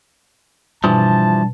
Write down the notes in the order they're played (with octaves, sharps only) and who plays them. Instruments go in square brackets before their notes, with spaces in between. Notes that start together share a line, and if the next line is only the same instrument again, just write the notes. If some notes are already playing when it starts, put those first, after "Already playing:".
[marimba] B2 [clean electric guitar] E3 F3 [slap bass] G3 D4 [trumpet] A5